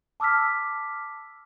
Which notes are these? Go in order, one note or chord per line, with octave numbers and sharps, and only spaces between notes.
A5 D6 E6 F6 B6